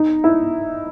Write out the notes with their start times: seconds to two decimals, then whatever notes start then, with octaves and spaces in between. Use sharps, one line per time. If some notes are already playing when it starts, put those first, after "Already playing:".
Already playing: D#4
0.24 E4